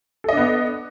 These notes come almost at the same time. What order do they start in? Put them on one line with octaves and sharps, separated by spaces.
A4 D#5 D4 B3